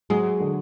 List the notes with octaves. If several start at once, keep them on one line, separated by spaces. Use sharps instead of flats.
F#3 G#3
D3